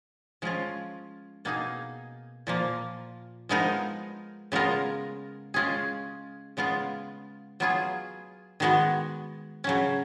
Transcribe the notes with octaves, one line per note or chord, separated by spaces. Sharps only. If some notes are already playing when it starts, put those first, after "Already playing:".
F3 G#3 C#4 F4
B2 A#3 D#4 G#4
A#2 F3 A#3
F3 G#3 B3 D#4 A#4
C#3 G#3 B3 F4 A#4
G#3 C#4 F4 G#4
C#3 G#3 B3 F4
F#3 B3 F4 G#4
D#3 G#3 B3 F#4
C#3 F#3 C#4